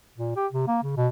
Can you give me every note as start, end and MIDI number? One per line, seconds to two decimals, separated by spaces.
0.18 0.32 46
0.36 0.47 67
0.52 0.66 48
0.68 0.80 58
0.83 0.96 49
0.97 1.08 47